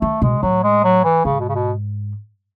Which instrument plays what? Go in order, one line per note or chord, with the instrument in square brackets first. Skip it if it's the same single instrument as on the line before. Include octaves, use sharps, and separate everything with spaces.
[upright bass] D#3 [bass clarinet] A3
[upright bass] B2 [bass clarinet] G#3
[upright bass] A2 [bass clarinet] F#3
[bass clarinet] G#3
F#3
E3
[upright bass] G#2 [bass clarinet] C#3
[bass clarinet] B2
C#3
B2